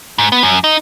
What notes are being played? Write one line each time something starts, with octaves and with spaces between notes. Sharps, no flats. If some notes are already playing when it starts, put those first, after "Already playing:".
G#2
B3
F#2
D#4